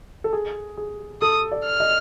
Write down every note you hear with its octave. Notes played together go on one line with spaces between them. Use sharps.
A4
G#4
G#4
A4 D#6
D5
F6
D#5